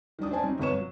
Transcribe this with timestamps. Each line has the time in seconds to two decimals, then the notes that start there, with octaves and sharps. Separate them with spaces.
0.19 D#3 F#3 D4 D#6
0.30 C#4 C5 D5 G#5 A5
0.43 C3 F#3 C4 D#4
0.59 G1 C3 B4 C#5 C#6 E7
0.73 F#3